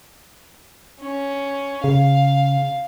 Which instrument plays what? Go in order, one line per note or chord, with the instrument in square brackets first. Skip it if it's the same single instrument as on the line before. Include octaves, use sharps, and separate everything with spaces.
[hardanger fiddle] C#4
[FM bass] C#3 [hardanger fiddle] F5